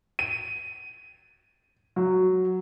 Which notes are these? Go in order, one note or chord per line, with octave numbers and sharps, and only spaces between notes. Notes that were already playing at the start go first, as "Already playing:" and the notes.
D#7
F#3